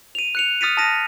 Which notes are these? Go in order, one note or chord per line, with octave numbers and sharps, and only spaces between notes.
D#7 F7
F#6 C#7 F7
D#6 F6 A6 B6 C#7 D#7
A5 D#6 F6 A6 A#6 D#7